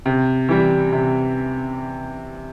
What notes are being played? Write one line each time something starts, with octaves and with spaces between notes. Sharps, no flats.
C3
E3 G3
C3